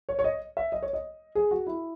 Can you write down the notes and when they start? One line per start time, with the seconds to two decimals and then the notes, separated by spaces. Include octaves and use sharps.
0.09 C#5
0.19 C#5
0.24 D#5
0.57 E5
0.72 D#5
0.82 C#5
0.93 D#5
1.35 G#4
1.51 F#4
1.67 E4